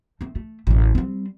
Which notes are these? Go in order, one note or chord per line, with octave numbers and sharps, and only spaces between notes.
A3 C4
A3
A1 F#2
G3 C4